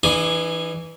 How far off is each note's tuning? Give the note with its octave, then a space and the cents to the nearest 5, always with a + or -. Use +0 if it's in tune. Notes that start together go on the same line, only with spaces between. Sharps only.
E3 +0 D4 +45 G#4 +0